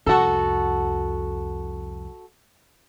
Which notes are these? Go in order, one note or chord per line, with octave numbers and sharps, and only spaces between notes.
C2 F2 F#4 A4